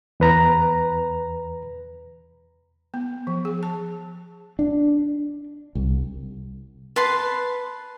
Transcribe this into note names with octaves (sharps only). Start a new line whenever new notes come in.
E2 B4 A#5
B3
F3
G#4
A5
D4
C2
B4 A5 C6